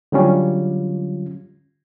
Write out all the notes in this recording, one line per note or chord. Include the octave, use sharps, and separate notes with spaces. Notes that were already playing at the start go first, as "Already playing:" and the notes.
D3 F#3 G3 C#4 F4